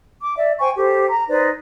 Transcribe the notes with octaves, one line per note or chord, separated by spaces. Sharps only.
D6
D5 E5
C5 G5 G#5 C#6
G4 A4 C5
A#5
D#4 B4 C5 D5